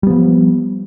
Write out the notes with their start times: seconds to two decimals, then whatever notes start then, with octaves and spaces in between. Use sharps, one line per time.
0.03 G3
0.07 B3
0.10 F3